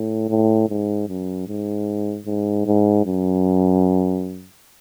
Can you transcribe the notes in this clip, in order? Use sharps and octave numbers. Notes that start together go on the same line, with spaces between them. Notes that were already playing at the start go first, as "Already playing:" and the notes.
Already playing: A2
A2
G#2
F#2
G#2
G#2
G#2
F#2